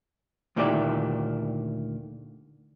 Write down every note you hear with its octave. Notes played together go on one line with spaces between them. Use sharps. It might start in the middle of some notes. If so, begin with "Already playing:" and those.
D2 A#2 D#3 E4 G4 D5